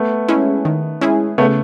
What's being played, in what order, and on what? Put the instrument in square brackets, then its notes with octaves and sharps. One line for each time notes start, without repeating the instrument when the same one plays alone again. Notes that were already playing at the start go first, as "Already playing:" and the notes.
Already playing: [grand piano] A3 B3
[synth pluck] G#3 C#4 E4 G#4
D#3
G#3 C#4 E4 G#4
[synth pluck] C#3 [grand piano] A3 B3